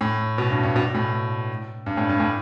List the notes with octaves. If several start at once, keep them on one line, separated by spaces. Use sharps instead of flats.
A2
B2
G2
G2
B2
A2
G2
A2
G2
A2